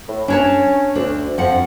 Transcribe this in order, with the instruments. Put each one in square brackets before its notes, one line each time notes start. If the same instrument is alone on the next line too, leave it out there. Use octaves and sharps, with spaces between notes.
[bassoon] A2
[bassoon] C#4 [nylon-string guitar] D4 C#5 A5
[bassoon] D2 [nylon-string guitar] D4
[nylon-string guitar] F2 F#5 [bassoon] F3